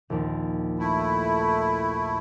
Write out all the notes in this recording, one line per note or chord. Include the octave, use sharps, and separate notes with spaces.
A#1 D#2
A3 E4